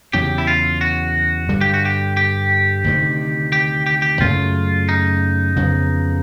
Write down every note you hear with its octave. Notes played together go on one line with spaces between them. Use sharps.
E2 C#3 F#3 G4
E4
F4
F#4
G2 D3 G3
G4
F#4
G4
G4
D2 C3 D#3
G4
G4
G4
F#2 C#3 F#3 A3 F4
D#4
F2 C#3 F#3 B3